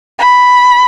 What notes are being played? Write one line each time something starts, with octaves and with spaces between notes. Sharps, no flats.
B5